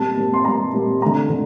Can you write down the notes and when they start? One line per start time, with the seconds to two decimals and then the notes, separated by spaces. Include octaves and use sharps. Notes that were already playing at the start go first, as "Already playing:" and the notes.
Already playing: A#2 G3 C4 A5
0.17 A#2 G3 C4
0.34 C6
0.45 A#2 G3 C4 A#5
0.73 A#2 G3 C4
1.01 D3 A3 C4 A#5
1.30 D3